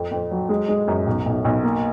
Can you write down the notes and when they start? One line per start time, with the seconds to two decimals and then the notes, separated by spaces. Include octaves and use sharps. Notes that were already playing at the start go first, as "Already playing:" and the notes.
Already playing: F2
0.11 F2
0.31 F#3
0.49 G#3
0.69 G#3
0.88 F#2
1.06 B1
1.26 B1
1.44 B1
1.63 A#3